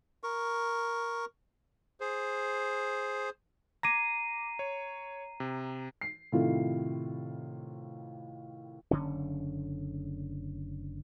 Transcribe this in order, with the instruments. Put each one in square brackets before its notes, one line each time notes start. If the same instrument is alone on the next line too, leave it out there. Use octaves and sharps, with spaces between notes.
[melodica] A#4 C#6
[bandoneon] G#4 C5
[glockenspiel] A#5 C7 D#7 [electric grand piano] D6 G#6 A#6
[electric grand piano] C#5
C3
[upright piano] C7
A2 C3 D#3 E4 F4
[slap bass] F#1 D3 C#4